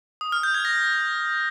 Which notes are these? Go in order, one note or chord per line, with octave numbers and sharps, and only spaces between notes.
D#6
F6
G6
G#6
A#6